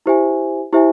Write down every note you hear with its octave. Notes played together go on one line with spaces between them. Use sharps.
E4 G4 C5 E5 G#5
E4 G4 C5 E5 G#5